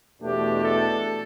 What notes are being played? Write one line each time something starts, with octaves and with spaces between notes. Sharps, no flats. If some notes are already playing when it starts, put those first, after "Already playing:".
E2 B2 A3 D4 G4
A4